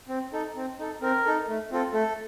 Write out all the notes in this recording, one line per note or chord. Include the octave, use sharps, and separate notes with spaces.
C4
D#4 A4
C4
D#4 A4
C4 A#4
D#4 A4
A3
C4 F4 A4
A3 A4